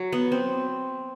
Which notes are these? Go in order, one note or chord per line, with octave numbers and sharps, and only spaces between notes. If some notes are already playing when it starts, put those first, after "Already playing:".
Already playing: F#3
B3
C4